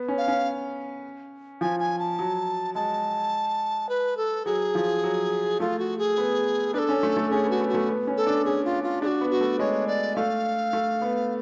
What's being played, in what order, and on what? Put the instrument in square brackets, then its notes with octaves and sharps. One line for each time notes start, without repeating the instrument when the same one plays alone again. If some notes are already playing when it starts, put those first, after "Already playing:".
Already playing: [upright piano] B3
C#4
[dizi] F5
[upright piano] C#4
[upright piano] F3 [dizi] G#5
[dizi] G#5
A5
[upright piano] F#3
[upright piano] G#3 [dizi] A5
[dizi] B4
A4
[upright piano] F#3 [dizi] G#4
[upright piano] F3
F#3
[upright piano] A3 [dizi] F4
[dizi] F#4
G#4
[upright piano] B3
[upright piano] D4 [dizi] B4
[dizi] A4
[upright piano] C#4
A3
A3
[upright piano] C#4 [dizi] G#4
[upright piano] B3
[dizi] F#4
[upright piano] B3
[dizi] F#4
[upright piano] A3
B3
C#4
[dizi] A4
[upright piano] D4
[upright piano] C#4 [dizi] G#4
[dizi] F4
F4
[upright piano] D4 [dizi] F#4 G#4
[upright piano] B3
[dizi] F#4
[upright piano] A3
[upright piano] G#3 [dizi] C#5
[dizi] D5
[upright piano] A3 [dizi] F5
[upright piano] A3
B3